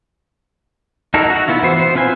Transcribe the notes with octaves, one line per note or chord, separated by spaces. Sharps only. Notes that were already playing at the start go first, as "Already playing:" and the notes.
D#4 E4 F#4 A4 A#4
F#4 F#5
B3 E4 F4
E3 B3 F#4 C5
C5
C4 F4 B4 G#5